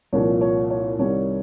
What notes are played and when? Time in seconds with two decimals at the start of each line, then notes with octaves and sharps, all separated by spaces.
0.13 C2 A#2 F3 C#5
0.41 C#5
0.70 C#5
0.99 C2 C3 D#3 G3 C#5